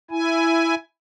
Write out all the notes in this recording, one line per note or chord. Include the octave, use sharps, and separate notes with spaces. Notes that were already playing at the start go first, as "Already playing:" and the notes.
E4 G#5